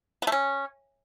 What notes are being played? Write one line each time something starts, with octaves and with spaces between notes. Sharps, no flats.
B3
A3
C#4